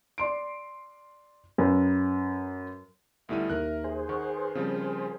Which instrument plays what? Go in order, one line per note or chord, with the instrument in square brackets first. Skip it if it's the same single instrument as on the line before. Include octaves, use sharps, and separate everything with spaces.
[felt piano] D5 C6 D7
F#2 B4
[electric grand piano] D2 B2 G3 [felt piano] A3 E4 D#7 [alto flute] E5
[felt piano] D#2 [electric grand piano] A#4 F#6 [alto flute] E5
[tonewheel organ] G#4 C5
[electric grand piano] D#3 [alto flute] F#5 [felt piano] C#6
[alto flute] B4
[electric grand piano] C#3 F3 G3 [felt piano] C4 [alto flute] A#4